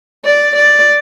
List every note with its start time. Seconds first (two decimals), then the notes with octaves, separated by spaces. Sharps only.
0.25 D5
0.56 D5